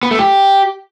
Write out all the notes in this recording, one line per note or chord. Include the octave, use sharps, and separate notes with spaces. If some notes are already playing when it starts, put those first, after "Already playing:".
B3
A3
G4